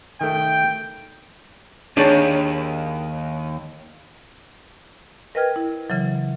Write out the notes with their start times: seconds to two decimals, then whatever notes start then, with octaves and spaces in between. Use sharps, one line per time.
0.21 D#3 A3 G5
1.97 D#2 D4 D#4 G#4 C#5 A5
5.35 A#4 B4 D#5 G5 F6 G#6
5.56 E4
5.90 C#3 E3 F#3